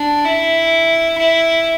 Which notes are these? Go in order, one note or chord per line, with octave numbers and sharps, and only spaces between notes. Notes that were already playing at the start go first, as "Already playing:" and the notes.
Already playing: D4
E4
E4